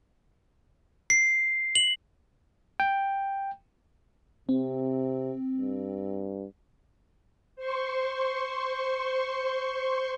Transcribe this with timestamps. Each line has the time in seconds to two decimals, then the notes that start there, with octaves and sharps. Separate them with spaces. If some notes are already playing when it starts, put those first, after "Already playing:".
1.10 C7
1.75 F#7
2.80 G5
4.49 C3 C4
5.57 G2
7.56 C5 C6 C#6